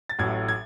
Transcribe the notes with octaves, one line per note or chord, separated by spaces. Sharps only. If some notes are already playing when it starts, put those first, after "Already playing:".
A6
A1 A2 F#3 G#6
G#6